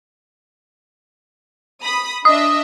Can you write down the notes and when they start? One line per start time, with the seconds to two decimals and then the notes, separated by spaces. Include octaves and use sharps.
1.84 B5 D#6
2.25 D4 D#5 E5 D#6